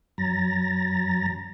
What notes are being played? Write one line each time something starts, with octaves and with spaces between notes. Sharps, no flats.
F#2 F#3 A#5 A6 A#6